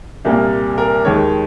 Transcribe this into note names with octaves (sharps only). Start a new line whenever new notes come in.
C2 A#2 G3 A#3
A#4
D#2 D#3 G#3 C#5